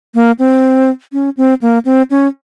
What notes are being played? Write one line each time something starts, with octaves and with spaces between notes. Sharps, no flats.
A#3
C4
C#4
C4
A#3
C4
C#4